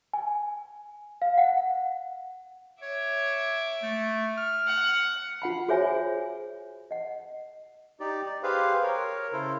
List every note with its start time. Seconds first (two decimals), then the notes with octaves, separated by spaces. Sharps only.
0.13 G#5
1.22 F5
1.38 F#5
2.82 C#5 E5 D6
3.83 A3
4.37 F6
4.67 F#5
5.42 F4 F#5 B5
5.68 F#4 G#4 C5 C#5 E5 G#5
6.91 D#5 F#5
8.00 D#4 G4 D5
8.26 D5
8.43 G4 G#4 B4 C5 F5
8.82 A#4 C#5
9.33 C#3 E4 A4 C5